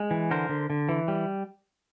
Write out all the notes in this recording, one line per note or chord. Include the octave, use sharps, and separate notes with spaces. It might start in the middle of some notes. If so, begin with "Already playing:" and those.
Already playing: G#3
E3
D3 A#4 C5
D3
D3
E3
G3